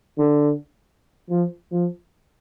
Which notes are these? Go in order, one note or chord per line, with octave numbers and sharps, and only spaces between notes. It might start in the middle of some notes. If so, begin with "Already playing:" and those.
D3
F3
F3